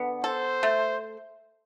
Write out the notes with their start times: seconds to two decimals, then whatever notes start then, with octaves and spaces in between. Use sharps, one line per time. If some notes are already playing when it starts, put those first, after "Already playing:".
Already playing: D3 B3
0.24 A4 C5
0.63 A3